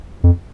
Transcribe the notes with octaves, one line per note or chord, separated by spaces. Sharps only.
F2